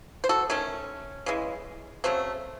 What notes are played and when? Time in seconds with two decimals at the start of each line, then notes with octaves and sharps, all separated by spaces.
0.24 C5
0.29 F#4 A4
0.50 D#3 A3 C#4
1.26 C#3 E3 G#3
2.04 C#3 F#3 A3 C4